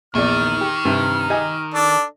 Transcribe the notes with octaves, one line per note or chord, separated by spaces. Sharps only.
A#1 E2 D#3 D5 F6
G4
G2 C3
G4 D#5 G#5
D4 A4 D5